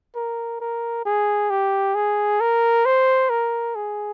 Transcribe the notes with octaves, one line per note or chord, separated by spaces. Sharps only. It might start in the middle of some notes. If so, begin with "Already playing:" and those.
A#4
A#4
G#4
G4
G#4
A#4
C5
A#4
G#4